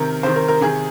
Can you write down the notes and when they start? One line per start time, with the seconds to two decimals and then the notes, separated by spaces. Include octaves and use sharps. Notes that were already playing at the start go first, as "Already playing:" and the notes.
Already playing: C3 D#3 A#4
0.23 C3 D#3 C5
0.36 A#4
0.48 A#4
0.61 C3 D#3 G#4